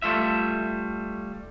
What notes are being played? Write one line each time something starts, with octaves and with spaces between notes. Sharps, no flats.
G3 A3 F4 E5